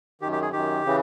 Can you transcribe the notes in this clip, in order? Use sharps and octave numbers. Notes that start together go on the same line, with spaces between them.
F#2 D#3 G4
G4
G#4
F#2 D#3 G4
C#3 E3